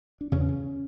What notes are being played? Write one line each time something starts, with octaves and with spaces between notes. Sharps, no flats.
D4
E2 C#3 C#4
C#3